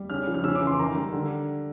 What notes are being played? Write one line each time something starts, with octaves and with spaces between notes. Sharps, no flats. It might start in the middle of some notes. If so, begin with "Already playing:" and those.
Already playing: G3
C#3 F6
F3
F6
C#3 E6
D6
E3
C6
D#3 A#5
G3
D3